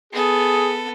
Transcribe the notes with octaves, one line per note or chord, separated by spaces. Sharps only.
B3 G#4 A4